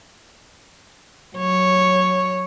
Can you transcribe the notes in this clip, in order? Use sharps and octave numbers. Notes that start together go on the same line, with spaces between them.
F#3 C#5